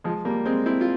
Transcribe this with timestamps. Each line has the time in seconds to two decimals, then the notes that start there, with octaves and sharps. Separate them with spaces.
0.04 F3 G#3
0.25 G3 A#3
0.45 G#3 C4
0.66 C4 E4
0.81 F4